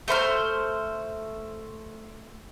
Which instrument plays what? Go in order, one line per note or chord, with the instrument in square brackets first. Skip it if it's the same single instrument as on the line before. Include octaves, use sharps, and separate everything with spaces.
[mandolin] A3 C5 B5 F6